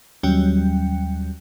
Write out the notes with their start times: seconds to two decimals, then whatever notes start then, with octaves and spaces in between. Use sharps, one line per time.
0.23 D#2 F#3 G3 C#4 G5